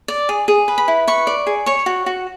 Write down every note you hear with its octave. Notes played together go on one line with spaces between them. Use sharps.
D5
G#4
G#4
B4
B5
E4
B4 C#6
D5
G#4
C#5 C#6
F#4
F#4